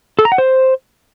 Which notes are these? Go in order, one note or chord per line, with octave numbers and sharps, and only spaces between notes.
A4
A#5
F#5
C5